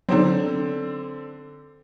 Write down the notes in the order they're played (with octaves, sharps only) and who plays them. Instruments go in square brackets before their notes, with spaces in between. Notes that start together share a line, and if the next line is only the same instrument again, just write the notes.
[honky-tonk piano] D3 C4 [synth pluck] F#3 B3 D#4